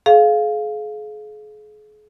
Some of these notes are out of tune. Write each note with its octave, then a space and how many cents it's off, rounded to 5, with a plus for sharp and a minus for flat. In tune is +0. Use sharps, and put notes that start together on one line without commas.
G#4 +40 D5 -45 F5 +0